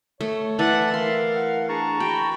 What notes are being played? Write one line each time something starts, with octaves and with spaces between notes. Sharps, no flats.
A3 C#5
E3 A4 D5 E5 F#5
A#4 F5 C6
F#5
D4 G#4 A5 A#5 C#6
F#4 G5 B5